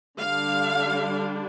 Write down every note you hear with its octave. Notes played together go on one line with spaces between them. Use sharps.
D3 G3 D4 F5